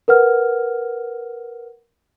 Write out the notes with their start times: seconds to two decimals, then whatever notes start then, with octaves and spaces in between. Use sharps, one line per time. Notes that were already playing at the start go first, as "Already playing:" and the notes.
0.08 A#4 B4 F#5 F6